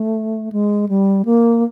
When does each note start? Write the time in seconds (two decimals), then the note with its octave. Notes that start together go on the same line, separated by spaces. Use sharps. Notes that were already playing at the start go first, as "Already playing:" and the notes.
Already playing: A3
0.52 G#3
0.89 G3
1.25 A#3